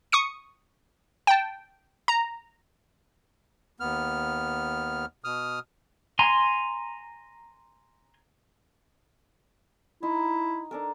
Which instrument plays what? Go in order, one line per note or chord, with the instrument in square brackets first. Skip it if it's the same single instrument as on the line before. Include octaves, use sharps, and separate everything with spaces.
[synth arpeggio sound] C#6 D#6 C#7
G5 A5
A#5
[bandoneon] D#2 B3 F6
B2 D#6 F6
[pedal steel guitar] G#5 A#5 C6
[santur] D#4 D#5 C6 [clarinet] E4
[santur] D4 A4 A#4